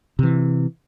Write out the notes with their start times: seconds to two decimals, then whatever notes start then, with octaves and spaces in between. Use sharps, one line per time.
0.19 C3 E3